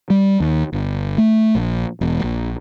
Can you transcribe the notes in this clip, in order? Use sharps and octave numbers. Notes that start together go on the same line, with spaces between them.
G3
D#2
G1
A3
A#1
E1
A#1